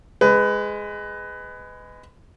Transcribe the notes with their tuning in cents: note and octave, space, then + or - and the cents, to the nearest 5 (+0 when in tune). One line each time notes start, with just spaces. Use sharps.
G#3 +0 B4 +20